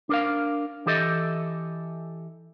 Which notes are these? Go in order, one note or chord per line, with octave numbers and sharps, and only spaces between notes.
D4 A#4 F5
E3 G4 A4 D#5 E5